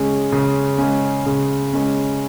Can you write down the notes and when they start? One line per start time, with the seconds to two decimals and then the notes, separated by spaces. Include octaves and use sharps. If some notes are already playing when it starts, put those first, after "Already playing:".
Already playing: C#3 G#3 C#4
0.32 C#3
0.78 G#3 C#4
1.26 C#3
1.73 G#3 C#4